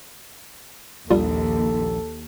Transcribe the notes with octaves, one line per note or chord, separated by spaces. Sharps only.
A#1 D#2 G3 F4 A4